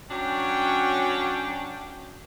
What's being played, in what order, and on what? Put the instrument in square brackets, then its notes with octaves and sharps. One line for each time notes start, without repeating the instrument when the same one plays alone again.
[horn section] F#3 C#4 D4 F#4 G5